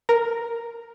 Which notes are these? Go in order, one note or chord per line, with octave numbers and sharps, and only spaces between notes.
A#4